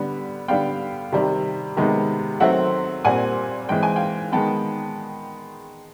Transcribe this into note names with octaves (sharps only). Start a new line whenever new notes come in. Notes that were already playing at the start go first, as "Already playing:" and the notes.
Already playing: D3 G3 B3
D3 G3 B3 F5 G5
C3 D#3 G3
C3 D#3 G#3 B3
D#3 F#3 A3 C4 E5 F#5
A#2 G3 C4 F#5 G#5
E3 G#3 C4 G5
G#5
F5 G5
D#3 G#3 B3 G5 A5